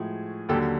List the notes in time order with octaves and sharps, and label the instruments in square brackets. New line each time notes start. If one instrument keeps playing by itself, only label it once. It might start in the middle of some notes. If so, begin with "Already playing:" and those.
Already playing: [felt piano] A2 F3 G#3 F#4 G#4
D#2 D3 F#3 G4 A4